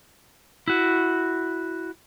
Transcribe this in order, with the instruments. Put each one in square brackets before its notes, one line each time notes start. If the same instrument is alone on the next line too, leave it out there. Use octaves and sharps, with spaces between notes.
[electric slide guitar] E4 F#4